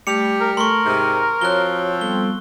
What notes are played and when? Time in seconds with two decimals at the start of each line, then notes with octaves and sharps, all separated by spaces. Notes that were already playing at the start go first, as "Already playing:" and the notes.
0.07 G3 A3 G4 C#7 F7
0.40 A#4
0.57 A3 A4 A#4 C6 C#6
0.85 G#2 C3 A#5
1.41 F3 C4 F#4 C#5 F#6 G7
2.01 G3 B3 A4 G7